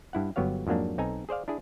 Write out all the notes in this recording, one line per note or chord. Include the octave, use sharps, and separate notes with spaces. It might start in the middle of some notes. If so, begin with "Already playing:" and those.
G2 E4 F#5
G1 F#3 B3 G4 C#5 F5
F2 G#2 F#3 A#3 D4
B1 C4 D#4 A4 G#5 A#5
G#4 C5 D5 F5
D4 E4 G#4